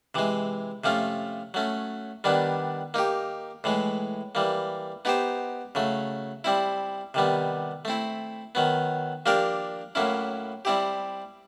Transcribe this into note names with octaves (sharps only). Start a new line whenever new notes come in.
C3 E3 G#3
C3 F3 A3 C#4 F4
F#3 A3 C#4
D#3 G3 B3 D4
A#3 D#4 G4
A2 E3 G#3
E3 G3 A#3
B3 D#4 G4 C5
C#3 F#3 A3
G3 C4 E4
C3 D#3 G3 B3
A3 C4 E4
D#3 F#3 B3
F3 A#3 D4 G4 A#4
A2 F#3 A#3 C#4 E4
G3 C4 E4 G4